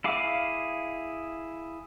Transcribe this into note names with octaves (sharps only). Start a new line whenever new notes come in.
E4 G#4 F5 D6